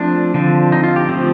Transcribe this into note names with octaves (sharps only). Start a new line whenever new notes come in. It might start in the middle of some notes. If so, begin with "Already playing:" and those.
Already playing: F3 A3 C4 D4
D3 F3 C4
D#4
F4
G4
F3 A3 C4